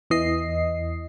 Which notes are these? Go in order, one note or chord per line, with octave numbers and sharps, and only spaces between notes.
E2 E3 D#5 C7